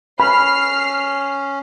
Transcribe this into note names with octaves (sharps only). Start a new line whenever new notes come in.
C#4 B5 F6 C7